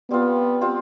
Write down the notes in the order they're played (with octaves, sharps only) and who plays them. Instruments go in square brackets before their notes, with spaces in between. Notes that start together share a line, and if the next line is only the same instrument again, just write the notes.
[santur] G3 C4 F4 [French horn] B3
[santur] G3 C4 F4